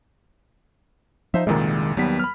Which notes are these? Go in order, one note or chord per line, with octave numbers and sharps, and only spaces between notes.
F3 D#4 C5 E5
C2 F2 A#2 D#3 G#3
D#2 F#3 G3 B3 B6
B5 F6